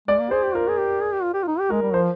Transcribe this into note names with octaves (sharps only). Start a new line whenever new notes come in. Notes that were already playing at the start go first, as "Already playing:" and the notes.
G#3 D5
A#3
G#4 C5
G4
F4 A#4
G#4
G4
G#4
G4
F4
G4
F4
D#4
G4
G#3 A#4
G3
F3 C5